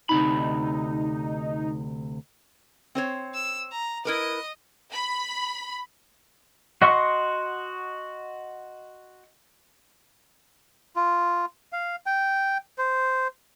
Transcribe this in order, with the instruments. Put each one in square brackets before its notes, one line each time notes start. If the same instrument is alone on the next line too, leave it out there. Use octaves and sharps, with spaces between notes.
[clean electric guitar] D2 C3 B5 [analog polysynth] D#4
[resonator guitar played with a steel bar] C4 C5 C#5
[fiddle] E6
A#5
[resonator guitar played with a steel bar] E4 A#4 B4 [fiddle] D#5
[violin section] B5
[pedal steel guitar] F#4 D#5 F#5 C6 C#6
[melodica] F4
F5
G5
C5